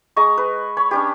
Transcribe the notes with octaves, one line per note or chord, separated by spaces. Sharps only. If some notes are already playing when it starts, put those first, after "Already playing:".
G#3 D#5 A#5 C#6
B4
C#5 B5
C#4 D4 G4